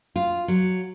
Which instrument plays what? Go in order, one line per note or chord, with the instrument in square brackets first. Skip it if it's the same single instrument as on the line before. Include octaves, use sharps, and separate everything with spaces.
[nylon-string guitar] F4
F#3